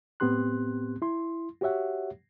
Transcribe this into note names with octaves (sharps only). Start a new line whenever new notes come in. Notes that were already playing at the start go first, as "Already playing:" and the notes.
A2 B3 C4 G4 C6 F#6
E4 C6
F#4 G4 C#5 E5 F#5